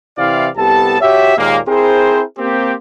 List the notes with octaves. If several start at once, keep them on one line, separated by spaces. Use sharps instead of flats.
C3 E3 E4 D5 F5
C2 B3 G4 A4 A5
F#4 G4 C#5 E5
D#2 A#2 G#3 A#3
C4 E4 G#4 A#4 C5
A#3 C4 G4